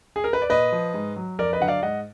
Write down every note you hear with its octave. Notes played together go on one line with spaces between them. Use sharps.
G#4
A#4
B4
D5
A#2 B4 D#5
F3
G#2
F#3
F2 A#4 D5
B4 D#5
D3 F#3 F#5
D5 F5
G#2 D#5 F#5